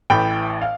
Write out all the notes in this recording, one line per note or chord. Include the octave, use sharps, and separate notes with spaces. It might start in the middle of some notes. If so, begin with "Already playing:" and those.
A1 A2 E3 G5 B5
F5